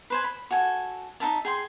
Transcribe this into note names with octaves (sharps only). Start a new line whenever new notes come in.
B4 C5 G#5
B5
F#4 A4 G#5
D#4 E4 E5 A5
G#4 G5 C6